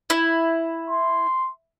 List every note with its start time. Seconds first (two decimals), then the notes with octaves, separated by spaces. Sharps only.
0.10 E4
0.90 C6